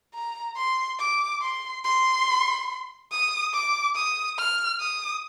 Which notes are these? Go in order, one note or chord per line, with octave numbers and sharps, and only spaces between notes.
A#5
C6
D6
C6
C6
D#6
D6
D#6
F6
D#6